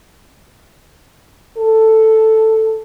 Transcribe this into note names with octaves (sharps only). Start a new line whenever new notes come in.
A4